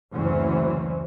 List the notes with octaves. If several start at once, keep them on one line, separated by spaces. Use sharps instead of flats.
F#1 D2 E3 F#3 C4 C#4